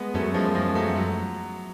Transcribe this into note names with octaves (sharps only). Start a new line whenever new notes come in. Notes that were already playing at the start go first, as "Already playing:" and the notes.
Already playing: G#3 B3
F#2 A3 C#4
F3 G#3
F3 G#3
F#3 A3
F#3